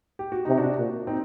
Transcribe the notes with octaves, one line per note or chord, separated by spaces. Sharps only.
G4
F#4
C3 D#4
D4 F#4
A#2
C4 D#4